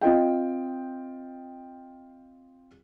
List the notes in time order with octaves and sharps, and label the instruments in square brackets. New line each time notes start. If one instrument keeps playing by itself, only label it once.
[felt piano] C4 F4 D#5 G5